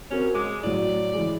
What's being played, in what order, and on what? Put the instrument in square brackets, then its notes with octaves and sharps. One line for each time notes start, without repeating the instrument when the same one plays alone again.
[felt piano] C4 F#4 A#4 [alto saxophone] C#4
[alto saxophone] G#3 [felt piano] D6
[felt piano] A2 F#3 [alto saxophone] D5
[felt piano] E3 G#3